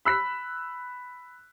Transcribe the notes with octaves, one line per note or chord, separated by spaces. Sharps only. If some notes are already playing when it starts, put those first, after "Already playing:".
B5 E6 F#6 B6